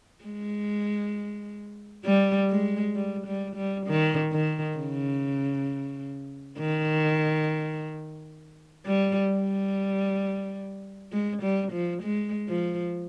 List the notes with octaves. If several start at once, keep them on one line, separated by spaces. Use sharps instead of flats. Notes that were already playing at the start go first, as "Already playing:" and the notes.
G#3
G3
G#3
G3
G3
G3
D#3
D#3
C#3
D#3
G3
G3
G#3
G3
F3
G#3
F3